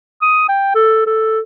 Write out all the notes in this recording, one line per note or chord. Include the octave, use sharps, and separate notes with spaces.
D#6
G5
A4
A4